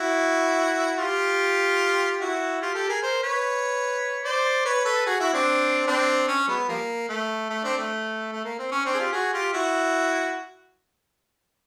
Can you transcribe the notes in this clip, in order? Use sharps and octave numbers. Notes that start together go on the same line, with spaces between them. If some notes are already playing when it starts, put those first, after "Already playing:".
Already playing: E4 F#4
F4 G4
E4 F#4
F4 G4
G4 A4
G#4 A#4
A#4 C5
B4 C#5
C5 D5
B4 C#5
A4 B4
F#4 G#4
E4 F#4
C4 D4
C4 D4
C#4
F#3 G#3 B3
F3 G3 A#3
A3
A3
C4 D4
A3
A3
A#3
C4
C#4
C4 D4
G#4
F4 G4
F#4 G#4
F4 G4
E4 F#4